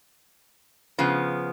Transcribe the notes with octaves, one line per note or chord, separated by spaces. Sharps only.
C#3 F3 B3